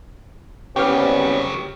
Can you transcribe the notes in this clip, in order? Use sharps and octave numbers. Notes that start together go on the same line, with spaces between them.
C2 C#3 F#3 B3 C#4 G4 F6